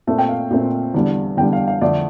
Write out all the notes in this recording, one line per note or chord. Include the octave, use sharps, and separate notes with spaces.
A#2 A3 C4 A4
G5
F5
A#2 A3 C4
E2 D3 G3 D4
E2 D3 G3 D4 G5
F5
F5
F2 D3 A3 D5